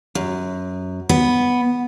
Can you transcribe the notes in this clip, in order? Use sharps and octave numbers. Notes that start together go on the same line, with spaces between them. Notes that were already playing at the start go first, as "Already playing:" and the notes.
F#2
B3